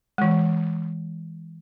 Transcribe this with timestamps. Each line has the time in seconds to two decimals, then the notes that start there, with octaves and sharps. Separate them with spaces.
0.18 E3 G#3